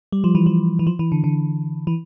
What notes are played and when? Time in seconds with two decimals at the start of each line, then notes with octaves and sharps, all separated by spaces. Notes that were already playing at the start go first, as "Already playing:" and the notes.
0.12 G3
0.24 F3
0.35 E3
0.46 F3
0.79 E3
0.87 F3
0.99 E3
1.12 D3
1.24 D3
1.87 E3